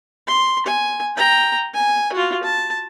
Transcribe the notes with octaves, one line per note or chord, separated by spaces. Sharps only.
C6
G#5
G5 A#5
G#5
F4 F#4
A5